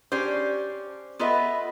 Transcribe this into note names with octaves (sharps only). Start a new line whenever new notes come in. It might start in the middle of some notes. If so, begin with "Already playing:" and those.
C#4 D4 G4 C5
B3 F4 A4 B4 D#5 E5